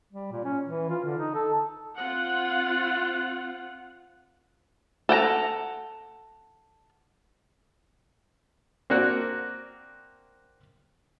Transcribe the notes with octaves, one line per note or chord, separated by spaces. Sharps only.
G3
A#2
C#4
E3
F4
D3
D#4
A4
C4 F4 F#5
A4 F#5 G5 A#5
A#3 C4 D4 F#4